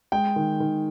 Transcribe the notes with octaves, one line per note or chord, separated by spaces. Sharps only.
G#3 G5
D#3
D#3